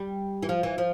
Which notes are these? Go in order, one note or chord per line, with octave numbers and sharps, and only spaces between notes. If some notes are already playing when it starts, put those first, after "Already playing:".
Already playing: G3
E3
F3
E3
F3